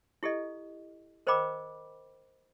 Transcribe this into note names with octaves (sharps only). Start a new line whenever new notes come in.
E4 G4 A4 D#5
A#4 C5 D#5 G5 B5 D6